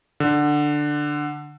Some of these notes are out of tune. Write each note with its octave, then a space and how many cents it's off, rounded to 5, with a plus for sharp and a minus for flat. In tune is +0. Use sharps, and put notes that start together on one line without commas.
D3 +10